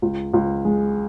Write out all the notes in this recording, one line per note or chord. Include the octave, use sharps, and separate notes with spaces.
C#2
C#2
G#3